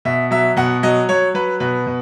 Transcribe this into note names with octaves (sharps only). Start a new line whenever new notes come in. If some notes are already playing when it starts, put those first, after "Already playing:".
B2 E5
F#3 E5
B2 F#5
F#3 D#5
F#3 C#5
F#3 B4
B2 B4
B2